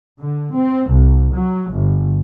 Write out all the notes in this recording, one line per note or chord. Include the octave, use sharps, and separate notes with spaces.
D3
C4
C2
F#3
G1